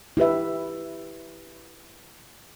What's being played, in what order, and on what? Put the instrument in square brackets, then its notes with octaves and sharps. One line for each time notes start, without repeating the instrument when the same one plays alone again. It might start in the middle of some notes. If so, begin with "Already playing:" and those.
[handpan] E4 G4 B4 E5